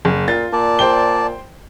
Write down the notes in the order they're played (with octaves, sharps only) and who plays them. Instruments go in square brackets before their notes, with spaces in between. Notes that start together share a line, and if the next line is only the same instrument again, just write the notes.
[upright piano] F#1
[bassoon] A#2 [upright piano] F4 A6
[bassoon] A#2 [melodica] D5 A5
[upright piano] C5 G5 G7